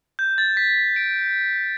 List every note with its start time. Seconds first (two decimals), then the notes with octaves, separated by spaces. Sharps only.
0.19 G6
0.38 A6
0.57 B6
0.78 B6
0.96 D7